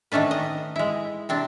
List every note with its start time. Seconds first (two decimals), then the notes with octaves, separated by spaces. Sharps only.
0.12 D#3 A3 C#4 D4 B4
0.31 D#5
0.76 G#3 E4
1.29 C3 C4 D4